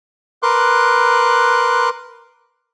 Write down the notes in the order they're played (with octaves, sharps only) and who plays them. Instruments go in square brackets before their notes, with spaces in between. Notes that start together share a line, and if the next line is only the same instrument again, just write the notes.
[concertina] A#4 B4 C6 D6 F#6